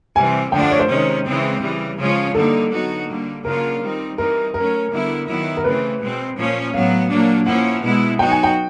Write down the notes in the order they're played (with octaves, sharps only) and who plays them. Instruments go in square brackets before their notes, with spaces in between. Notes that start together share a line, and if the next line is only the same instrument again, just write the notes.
[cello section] C3 E3 G3 C4 [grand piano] G#5
[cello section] D3 F3 A3 D4 [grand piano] G5
[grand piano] F#5
C#5
C5
[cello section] C3 D#3 G#3 C#4
C#3 E3 G#3 C4
C#3 E3 G3
C#3 F3 G#3 C#4 F4
[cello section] D3 G3 A#3 D#4 [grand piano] A4
[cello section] F#3 B3 D#4 F#4
D3 G3 A#3
[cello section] C#3 F#3 A#3 D4 F4 [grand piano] A#4
[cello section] D#3 G3 C4 D#4
[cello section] E3 G3 C4 D#4 [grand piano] A#4
[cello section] F#3 A3 C#4 [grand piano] A#4
[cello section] D3 G3 B3 E4
D#3 F#3 B3 E4
[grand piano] A#4
[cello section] C#3 E3 A3 C4 [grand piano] B4
[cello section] B2 G#3 C4
A#2 F3 A#3 C#4
[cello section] A2 F#3 B3 [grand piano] F5
[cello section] A#2 F#3 A#3 D4
[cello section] F3 A#3 C#4 E4 [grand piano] F#5
[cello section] B2 G#3 B3 E4
[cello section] F#3 B3 D#4 F#4 [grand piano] G5
[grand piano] G#5
G5